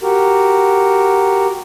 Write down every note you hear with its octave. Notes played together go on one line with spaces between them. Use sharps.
F#4 G4 A#4